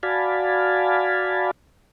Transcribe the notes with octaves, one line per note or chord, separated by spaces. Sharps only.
F#4 D5 F5 G#5 A5 B5